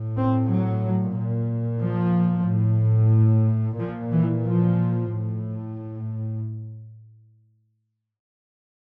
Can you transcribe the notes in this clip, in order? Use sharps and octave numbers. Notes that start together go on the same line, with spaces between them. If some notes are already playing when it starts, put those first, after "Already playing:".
Already playing: A2
C4
F#3
A#2
F3
A2
A#2 F3
E3
F3
A2